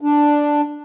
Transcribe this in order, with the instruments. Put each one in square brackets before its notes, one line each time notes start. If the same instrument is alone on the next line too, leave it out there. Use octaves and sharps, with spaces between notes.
[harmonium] D4